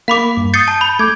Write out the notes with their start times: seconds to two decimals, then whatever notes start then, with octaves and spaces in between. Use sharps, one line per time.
0.08 A#3 F5 B5 D6
0.37 G2
0.54 D#6 G6 A6 C7 C#7
0.68 A5
0.81 B5 G6
0.99 A3 D6 G6 G#6